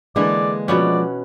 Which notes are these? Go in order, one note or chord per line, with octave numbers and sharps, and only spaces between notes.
D3 E3 G#3 A#3 D5
B2 F3 B3 C#4 D5